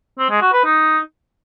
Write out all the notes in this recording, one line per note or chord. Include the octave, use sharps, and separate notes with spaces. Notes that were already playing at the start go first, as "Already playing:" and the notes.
C4
G#3
F#4
B4
D#4